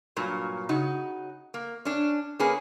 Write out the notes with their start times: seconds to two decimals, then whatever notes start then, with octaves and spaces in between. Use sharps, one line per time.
0.16 G2 A#2 F#3
0.69 C#3 D#4 F#4
1.54 A#3
1.85 C#4 D4
2.39 A#3 C#4 G#4 B4